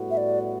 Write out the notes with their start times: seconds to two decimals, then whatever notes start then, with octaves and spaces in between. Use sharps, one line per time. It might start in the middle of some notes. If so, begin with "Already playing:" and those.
Already playing: A2 G3 B3 F#4
0.11 E5
0.17 D5